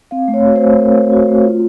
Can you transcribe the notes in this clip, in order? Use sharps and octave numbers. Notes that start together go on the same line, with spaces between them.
C4 F5
A3
C#5
F#4
C5
A3
C4 A#4
A3
F#4
A3
F4